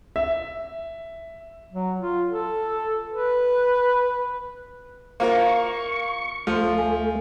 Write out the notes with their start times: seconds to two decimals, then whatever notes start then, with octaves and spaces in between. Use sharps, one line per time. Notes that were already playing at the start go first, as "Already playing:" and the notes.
0.16 E5
1.73 F#3
1.99 F4
2.29 A4
3.10 B4
5.20 A#3 F4 A#4 C5 E5 C#6
6.47 D2 F3 A3 C6
6.78 G#5